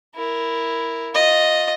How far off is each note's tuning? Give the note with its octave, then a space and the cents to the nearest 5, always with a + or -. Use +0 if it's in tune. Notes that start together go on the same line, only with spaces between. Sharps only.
E4 +0 A#4 +0
F4 +20 D#5 +0